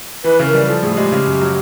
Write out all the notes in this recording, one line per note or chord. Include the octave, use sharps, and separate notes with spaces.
E3 B4
C#3
A#4
G3
F3 A4
A2 G#4
G#3 G4
C#3
F#2
F#3